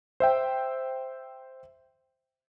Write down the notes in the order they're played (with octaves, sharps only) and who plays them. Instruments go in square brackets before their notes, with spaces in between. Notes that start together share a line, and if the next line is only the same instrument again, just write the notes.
[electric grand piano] C5 E5 G5